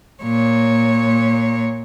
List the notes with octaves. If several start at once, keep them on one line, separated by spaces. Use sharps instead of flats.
A#2 C#5